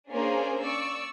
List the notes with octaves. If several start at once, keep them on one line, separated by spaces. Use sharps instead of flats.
A#3 C#4 D4 G#4 A#4 C5
D5 C#6 E6